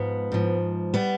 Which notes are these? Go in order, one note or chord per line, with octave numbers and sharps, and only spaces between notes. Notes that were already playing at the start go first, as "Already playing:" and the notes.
Already playing: G#2 F3 B3
G#2 F3
G3 B3